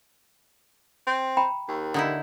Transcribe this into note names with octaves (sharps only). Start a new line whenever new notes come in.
C4
G5 A#5 B5
D#2
D3 D#4 E4